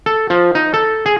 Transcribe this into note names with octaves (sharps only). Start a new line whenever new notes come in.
A4
F3
D#4
A4
G#4